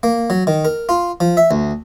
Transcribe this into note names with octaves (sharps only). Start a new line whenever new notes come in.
A#3
F#3
D#3
A#4
F4
F3
E5
D2